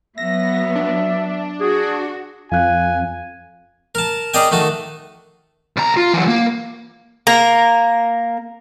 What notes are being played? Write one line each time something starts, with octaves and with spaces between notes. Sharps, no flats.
F#3 B3 E5 A#6
D4
F#4 G#4
F2 F5 G#5 F#6
A#4 A5
G#4 A#4 D5 D#5 G5 G#5
D#3 A3 F#4 A5
B1 A#5
F4
E3 F#3
A#3
A#3 A#4